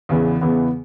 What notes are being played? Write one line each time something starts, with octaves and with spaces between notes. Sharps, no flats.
E2 C#3 E3 B3
E2 C#3 E3 B3